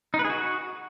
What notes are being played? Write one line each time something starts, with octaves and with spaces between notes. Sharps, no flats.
D#4
B4
G#4
F#4